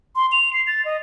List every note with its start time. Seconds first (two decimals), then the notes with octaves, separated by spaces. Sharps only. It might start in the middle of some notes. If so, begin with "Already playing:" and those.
0.16 C6
0.32 F7
0.53 C7
0.67 A6
0.85 D#5